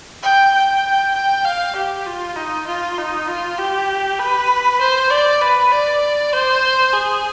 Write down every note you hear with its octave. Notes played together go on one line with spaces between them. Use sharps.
G5
G5
G5
F5
G4
F4
D#4
F4
D#4
F4
G4
B4
C5
D5
B4
D5
C5
G#4